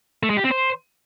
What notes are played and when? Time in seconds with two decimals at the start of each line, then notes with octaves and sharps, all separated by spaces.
0.23 A3
0.30 G#3
0.37 G4
0.44 C4
0.51 C5